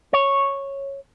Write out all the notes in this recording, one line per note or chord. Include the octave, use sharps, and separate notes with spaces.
C#5